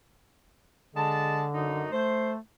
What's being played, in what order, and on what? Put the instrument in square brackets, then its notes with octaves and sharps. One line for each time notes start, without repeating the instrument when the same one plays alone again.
[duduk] D3 [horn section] G#3 A5
[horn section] F#2 D#4
[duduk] A3 [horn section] C5